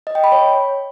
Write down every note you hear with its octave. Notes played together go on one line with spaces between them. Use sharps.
D#5
G5
B5
C#5